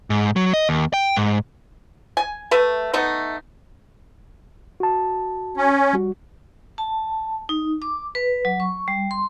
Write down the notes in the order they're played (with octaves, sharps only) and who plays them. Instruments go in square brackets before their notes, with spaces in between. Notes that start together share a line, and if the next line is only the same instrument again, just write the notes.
[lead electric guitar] G#2
F#3
D#5
D#2
G5
G#2
[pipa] G#5
A3 B4 E5
A3 B3 D#4 E5
[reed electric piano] F#4 A5
[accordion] C#4
[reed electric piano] G3 F#4
[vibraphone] A5
D#4
D6
B4
F#3
C#6
G3
C6